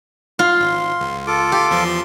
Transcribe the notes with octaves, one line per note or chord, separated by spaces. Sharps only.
F4 C6
G#1
C#2
F4 A4 D6
G4 F5
E2 F3 C6